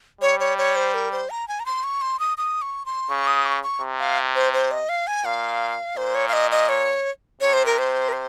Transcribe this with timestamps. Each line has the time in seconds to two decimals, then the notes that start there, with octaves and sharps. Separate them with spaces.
0.21 G3 C#5
0.40 C#5
0.58 C#5
0.76 C5
0.94 A#4
1.12 C5
1.30 A#5
1.48 G#5
1.60 A#5
1.66 C6
1.84 C#6
2.02 C6
2.20 D#6
2.38 D#6
2.62 C#6
2.86 C6
3.09 C#3 C#6
3.27 D#6
3.46 C#6
3.64 C#6
3.81 C3
3.99 F5
4.35 C5
4.53 C5
4.71 D#5
4.89 F5
5.07 G#5
5.25 A#2 F5
5.97 A#2 C5
6.15 C#5
6.28 F5
6.33 D#5
6.51 D#5
6.69 C#5
7.41 C3 C#5
7.53 C5
7.66 A#4
7.78 C5
8.09 A#4
8.13 C5